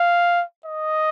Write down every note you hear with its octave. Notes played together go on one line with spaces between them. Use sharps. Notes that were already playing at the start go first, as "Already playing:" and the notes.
Already playing: F5
D#5